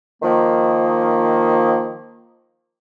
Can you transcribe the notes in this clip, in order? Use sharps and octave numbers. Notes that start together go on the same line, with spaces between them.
D#3 F3 A#3